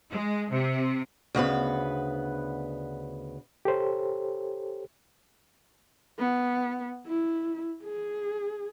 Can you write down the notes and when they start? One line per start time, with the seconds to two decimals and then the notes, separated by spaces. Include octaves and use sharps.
0.10 G#3
0.50 C3
1.35 D2 C#3 B3 B4
3.65 G4 A4 C5 C#5
6.19 B3
7.07 E4
7.83 G#4